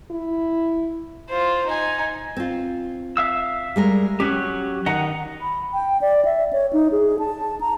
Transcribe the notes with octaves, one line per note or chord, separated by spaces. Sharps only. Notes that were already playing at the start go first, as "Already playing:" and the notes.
E4
F4 C5
D#4 G#5
C4 F4
E5 F5 E6
G3 G#3 A#4
F#3 C#4 G4
D#3 D#5 F#5 A#5
B5
G5
D5
E5
C#5
D#4
G#4
A5
A#5